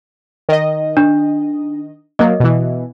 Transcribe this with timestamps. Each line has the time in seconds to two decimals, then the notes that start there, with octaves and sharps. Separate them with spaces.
0.49 D#3 D#5
0.97 D4
2.19 F#3 A#3 D#5
2.40 B2 E3